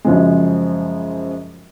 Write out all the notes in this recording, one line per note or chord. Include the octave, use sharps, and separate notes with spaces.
F#2 C#3 F3 G#3